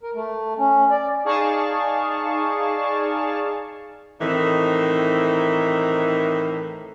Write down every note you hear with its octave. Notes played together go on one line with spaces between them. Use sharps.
A#4
A3
C#4
D5
D#4 G#4 D5 F5 A5 C#6
A2 D#3 E3 C4 D#4